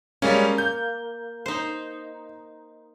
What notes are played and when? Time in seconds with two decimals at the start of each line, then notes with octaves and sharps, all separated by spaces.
0.22 G3 G#3 A#3 C#4
0.58 G6
1.46 D#4 C5